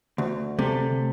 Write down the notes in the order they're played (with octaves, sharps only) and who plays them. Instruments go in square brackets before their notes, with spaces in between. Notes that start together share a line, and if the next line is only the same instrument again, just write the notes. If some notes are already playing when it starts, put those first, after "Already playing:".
[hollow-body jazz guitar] D2
[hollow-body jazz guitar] C3 [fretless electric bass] A3